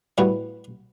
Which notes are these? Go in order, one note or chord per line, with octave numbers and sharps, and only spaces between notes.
A2 G3 B3 F#4